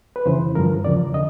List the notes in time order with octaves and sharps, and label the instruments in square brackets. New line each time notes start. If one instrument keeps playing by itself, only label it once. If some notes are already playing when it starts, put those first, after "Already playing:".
[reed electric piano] B4
F2 C#3 E3 C5
G2 D3 F3 A#4
E2 C#3 F3 D5
D3 D#5